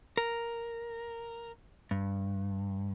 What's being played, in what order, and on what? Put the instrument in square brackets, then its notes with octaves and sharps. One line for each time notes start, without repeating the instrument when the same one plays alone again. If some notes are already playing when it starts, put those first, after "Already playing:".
[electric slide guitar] A#4
G2